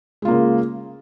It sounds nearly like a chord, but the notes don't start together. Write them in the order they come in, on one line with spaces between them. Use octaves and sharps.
G#3 F4 A#3 C#3